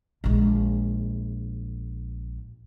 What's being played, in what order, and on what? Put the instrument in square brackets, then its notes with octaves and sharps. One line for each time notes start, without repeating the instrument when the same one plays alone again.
[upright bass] A#1 G#3